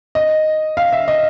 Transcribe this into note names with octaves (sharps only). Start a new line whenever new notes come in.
D#5
F5
E5
D#5